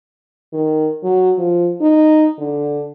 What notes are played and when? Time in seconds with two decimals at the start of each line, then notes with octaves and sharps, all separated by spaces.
0.53 D#3
1.04 F#3
1.38 F3
1.81 D#4
2.39 D3